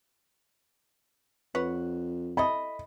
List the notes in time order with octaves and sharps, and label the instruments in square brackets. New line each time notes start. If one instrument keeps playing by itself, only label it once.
[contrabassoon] F2 [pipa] B4 C#5 F#5
[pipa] E4 A4 D#5 [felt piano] B5